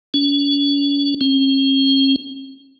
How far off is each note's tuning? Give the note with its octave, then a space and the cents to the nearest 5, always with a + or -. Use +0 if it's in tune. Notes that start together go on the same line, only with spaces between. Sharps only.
C#4 +40
C#4 -45